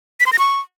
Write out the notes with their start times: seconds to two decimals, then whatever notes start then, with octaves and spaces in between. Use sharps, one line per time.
0.20 B6
0.26 C6
0.33 A#6
0.39 C#6